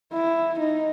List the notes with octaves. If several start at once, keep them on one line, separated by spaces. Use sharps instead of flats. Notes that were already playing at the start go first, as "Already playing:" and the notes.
E4
D#4